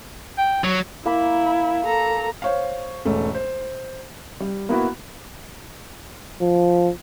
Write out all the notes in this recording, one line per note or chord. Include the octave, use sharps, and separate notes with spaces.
G5
F#3 C#5
A#3 E4 B5
A4 A#5
C5 C#5 F5
E1 G#2 A3 C#4
C5
G3
A#3 B3 E4 F#4
F3